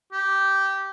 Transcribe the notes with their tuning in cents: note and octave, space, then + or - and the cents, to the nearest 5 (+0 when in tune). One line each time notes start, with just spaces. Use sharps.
G4 -10